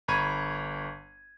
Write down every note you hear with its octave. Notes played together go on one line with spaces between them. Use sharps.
G1 A#5 B5 C#6 G#6 D#7